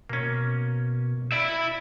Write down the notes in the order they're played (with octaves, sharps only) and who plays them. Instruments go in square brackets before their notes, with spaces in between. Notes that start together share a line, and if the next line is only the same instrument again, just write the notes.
[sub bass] B2 [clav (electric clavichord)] A#3 C#4
[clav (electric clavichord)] D5 [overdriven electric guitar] E5 B5